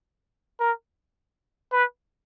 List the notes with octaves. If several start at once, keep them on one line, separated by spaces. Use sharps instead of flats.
A#4
B4